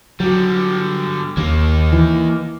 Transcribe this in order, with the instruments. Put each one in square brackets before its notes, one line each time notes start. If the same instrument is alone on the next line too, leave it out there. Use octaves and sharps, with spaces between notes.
[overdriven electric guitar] D3 G3 [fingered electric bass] F#3
[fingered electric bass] D#2 [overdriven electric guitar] A#3 D#4
[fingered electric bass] E3